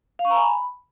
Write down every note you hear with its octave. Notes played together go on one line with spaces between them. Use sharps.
F5
C#6
A#5
G#5
B5